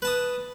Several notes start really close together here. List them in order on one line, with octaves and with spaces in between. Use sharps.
B4 A5 D#6